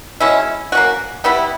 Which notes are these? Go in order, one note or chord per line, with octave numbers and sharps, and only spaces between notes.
B2 G#3 C#4 E4
A#3 C#4 F#4
G3 B3 E4